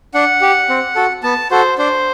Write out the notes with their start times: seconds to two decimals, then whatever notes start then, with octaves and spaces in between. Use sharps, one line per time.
0.14 D4 F#5
0.41 G4
0.69 C4
0.95 F#4 A4
1.23 B3 A5
1.51 F#4 A4 C5
1.78 D4 C5